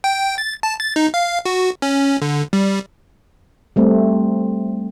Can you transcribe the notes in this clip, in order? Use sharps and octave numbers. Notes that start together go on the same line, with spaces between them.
G5
A6
A5
A6
D#4
F5
F#4
C#4
D3
G3
G3 A3 C4